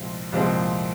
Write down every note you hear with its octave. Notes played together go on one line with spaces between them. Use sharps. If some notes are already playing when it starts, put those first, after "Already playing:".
Already playing: C2 A#2 F3 G#3 C4
C2 A#2 F3 G#3 C4